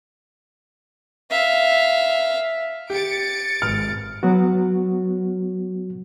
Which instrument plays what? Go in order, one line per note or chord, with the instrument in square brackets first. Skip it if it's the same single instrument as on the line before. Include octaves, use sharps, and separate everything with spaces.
[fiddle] E5 F5
[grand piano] G4 [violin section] A6 C#7 D7
[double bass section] G#1 [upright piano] F6
[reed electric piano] F#3 B3 F#4